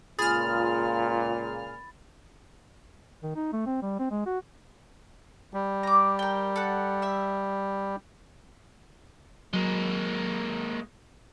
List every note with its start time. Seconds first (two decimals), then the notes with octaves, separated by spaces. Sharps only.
0.19 C#2 A#2 F4 G#4 B5 F6 A6
3.23 D#3
3.35 D#4
3.53 A3
3.66 C4
3.82 G3
3.99 C4
4.11 G#3
4.26 F#4
5.54 G3
5.83 A#5 D6
6.19 A#4 G5
6.56 A4 F#5
7.02 E5 E6
9.53 F#3 G#3 A#3